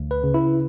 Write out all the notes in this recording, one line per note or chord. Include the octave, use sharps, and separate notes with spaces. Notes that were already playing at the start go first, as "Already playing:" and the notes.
Already playing: D2
B4
C#3
E4